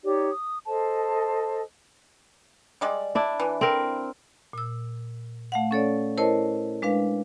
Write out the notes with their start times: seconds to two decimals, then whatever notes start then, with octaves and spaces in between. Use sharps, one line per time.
0.03 D#4 G4 C#5 D5
0.31 D#6
0.67 A4 C5 D#5 A5
2.81 G3 G#3 D5
3.15 D4 E4
3.40 E3
3.61 C4 A#4
4.53 A#2 E6
5.52 A3 F5 F#5
5.71 C#4 A4 C#5 D5
6.18 E4 A#4 C5 C#5 D#5 A5
6.82 G#3 D4 B4 F5